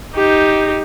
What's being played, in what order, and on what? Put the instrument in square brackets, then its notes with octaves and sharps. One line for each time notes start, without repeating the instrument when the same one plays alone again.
[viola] D#4 G4